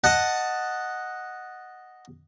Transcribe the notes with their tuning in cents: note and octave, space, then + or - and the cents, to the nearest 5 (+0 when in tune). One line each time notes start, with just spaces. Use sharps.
D#5 +0 F#5 +0 A5 +10